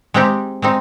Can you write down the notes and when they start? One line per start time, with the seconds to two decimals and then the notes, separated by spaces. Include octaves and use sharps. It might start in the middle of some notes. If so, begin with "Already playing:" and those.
0.14 G#3 C4 D#4 G4
0.62 G#3 C4 D#4